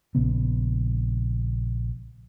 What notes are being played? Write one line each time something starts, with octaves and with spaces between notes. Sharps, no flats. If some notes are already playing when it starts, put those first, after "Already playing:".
A#1 C#3 B3